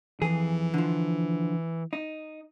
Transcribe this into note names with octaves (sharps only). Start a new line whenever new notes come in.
F2 E3 G#4
D3 F3
D#4